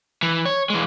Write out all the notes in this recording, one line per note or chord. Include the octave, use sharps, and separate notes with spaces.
E3
C#5
E3 G#3